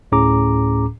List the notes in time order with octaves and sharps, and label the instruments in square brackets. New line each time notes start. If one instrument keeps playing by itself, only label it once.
[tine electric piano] D2 A2 C#4 G#4 A#5 D6